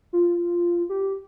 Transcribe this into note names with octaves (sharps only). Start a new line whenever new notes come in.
F4
G4